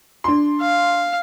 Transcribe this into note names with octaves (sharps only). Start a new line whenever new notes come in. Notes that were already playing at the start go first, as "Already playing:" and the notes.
D4 C6
F5